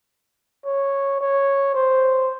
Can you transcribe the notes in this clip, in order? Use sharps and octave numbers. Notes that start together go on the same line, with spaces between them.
C#5
C#5
C5